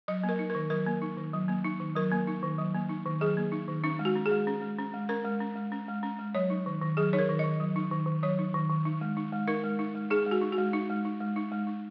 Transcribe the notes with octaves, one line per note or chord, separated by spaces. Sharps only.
F#3 D#5
A#3
A#4
D#4
D#3 A#4
F#3 A#4
A#3
D#4
D#3
F#3
A#3
D#4
D#3
F#3 A#4
A#3
D#4
D#3
F#3
A#3
D#4
D#3
F#3 G#4
A#3
D#4
D#3
C#4 D#4
G#3
F#4
C#4
G#4
G#3
C#4
G#3
C#4
G#3
C#4 A#4
G#3
C#4
G#3
C#4
G#3
C#4
G#3
F#3 C#5
D#4
D#3
D#3
F#3 G#4
D#4 C#5
A#4
D#3
D#3 D#5
F#3
D#4
D#3
D#3
F#3 C#5
D#4
D#3
D#3
D#4
G#3
D#4
G#3
D#4 A#4
G#3
D#4
G#3
D#4 G#4
G#3
F#4
D#4
F#4
G#3
D#4
G#3
D#4
G#3
D#4
G#3
D#4